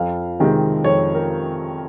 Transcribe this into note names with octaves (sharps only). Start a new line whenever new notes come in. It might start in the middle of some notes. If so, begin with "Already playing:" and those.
Already playing: F2 F5
C3 D#3 G#3 C4
F2 C#5
A#4